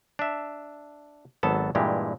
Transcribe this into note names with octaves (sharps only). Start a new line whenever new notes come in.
D4 E5
G#1 F#3 B3 A4 A5
G2 A#2 E3 G#3 G4